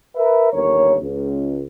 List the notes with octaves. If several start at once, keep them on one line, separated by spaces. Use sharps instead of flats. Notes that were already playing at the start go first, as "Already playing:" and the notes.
A#4 B4 E5
G1 D#2 A#4 C#5
C#2